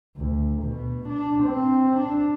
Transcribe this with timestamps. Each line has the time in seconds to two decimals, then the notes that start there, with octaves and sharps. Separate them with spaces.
0.17 D2
0.63 B2
1.09 D4
1.44 C4
1.97 D4